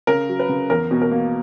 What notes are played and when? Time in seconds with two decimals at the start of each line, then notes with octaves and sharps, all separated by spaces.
0.07 C#3 A#4
0.29 F#3
0.39 B4
0.49 C#3
0.70 E2 A#4
0.91 B2
1.02 A#4
1.11 A#3